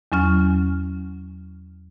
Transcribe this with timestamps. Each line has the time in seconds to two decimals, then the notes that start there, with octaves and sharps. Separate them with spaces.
0.12 E2 F#3 C#4 F6